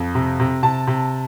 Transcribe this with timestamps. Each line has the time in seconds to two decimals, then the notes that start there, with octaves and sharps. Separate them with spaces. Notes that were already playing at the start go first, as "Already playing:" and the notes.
Already playing: F2
0.15 C3
0.40 C3
0.63 C3 A5
0.87 C3